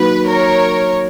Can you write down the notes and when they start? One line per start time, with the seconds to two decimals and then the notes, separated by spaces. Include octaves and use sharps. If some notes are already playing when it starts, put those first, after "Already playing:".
Already playing: F#3 A#3 D#4 F#4 B4
0.28 A#4 C#5